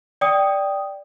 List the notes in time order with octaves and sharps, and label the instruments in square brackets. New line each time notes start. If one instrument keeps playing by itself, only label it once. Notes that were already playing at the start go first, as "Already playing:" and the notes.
[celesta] D5 G5 D#6